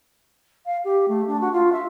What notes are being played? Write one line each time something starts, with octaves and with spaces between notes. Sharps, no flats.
F5
G4
A3
D4
F#4
F4
E5